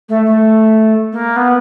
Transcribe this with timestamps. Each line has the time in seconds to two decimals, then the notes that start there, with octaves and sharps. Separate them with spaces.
0.09 A3
0.26 A3
1.12 A#3
1.36 B3